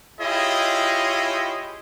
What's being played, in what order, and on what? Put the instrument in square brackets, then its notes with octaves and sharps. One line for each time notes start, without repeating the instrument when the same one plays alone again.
[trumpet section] E4 F4 G4 G#4 C#5 D#5